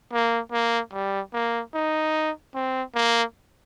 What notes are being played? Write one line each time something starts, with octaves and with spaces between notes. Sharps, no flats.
A#3
A#3
G3
A#3
D#4
C4
A#3